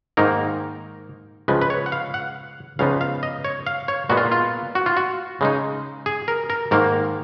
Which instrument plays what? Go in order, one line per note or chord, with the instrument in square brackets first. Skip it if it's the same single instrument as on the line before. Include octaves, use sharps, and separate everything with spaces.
[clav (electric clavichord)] G#2 D#3 A#3 D#4 A#4
C#2 C#3 F3 G#3 B4
B4
C#5
F#5
F5
F#5
C#2 C#3 F3 B3 D#4 F5
F5
D#5
C#5
F5
C#5
A#2 G#3 B3 F#4
F4
F4
F#4
F4
F#4
C#3 G#3 D#4
G#4
A#4
A#4
G#2 D#3 A#3 A#4